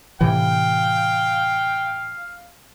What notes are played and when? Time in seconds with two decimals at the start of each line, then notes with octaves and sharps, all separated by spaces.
0.21 A2 C3 E3 F5 G5